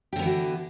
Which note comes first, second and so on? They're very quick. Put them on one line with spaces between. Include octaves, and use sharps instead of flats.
G4 D3 B3 E3 F#4